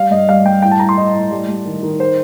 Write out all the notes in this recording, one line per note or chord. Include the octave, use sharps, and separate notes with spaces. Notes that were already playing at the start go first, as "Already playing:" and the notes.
Already playing: G3 F5
G2 D#5
G3 F5
G2 G5
A2 G5
A5
A2 A#5
C6
A2 D#5
A2
G3
G3
D#3
D#3
C5